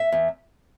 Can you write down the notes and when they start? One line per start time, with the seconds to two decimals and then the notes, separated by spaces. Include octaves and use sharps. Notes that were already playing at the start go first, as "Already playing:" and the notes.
Already playing: E5
0.12 E2